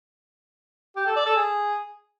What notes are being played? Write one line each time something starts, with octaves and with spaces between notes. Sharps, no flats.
G4
A4
D5
A4
G#4